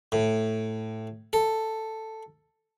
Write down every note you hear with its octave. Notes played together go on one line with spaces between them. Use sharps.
A2
A4